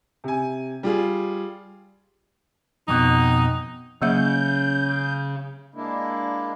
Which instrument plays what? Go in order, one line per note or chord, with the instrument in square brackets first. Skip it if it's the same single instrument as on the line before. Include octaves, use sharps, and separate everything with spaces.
[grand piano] C3 G#5
G3 F4 G#4
[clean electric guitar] F2 B2 [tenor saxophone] D#4
[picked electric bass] C#3 [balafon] F#3 A#3 E5 [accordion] G6
[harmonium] G#3 A#3 D4 E4